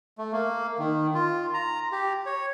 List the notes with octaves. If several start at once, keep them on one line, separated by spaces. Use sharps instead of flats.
A3
A#3
D#3
F4
A#5
G4
C#5